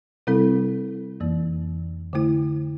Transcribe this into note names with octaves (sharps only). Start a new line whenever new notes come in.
C3 G3 C4 E4 A4
F2 E3 A#3
D3 A3 E4